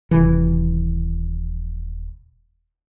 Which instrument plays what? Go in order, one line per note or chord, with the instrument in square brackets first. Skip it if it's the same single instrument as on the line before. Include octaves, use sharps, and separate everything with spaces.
[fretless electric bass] D#1 C3 E3